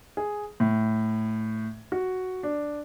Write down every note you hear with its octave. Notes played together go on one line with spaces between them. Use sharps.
G#4
A2
F#4
D4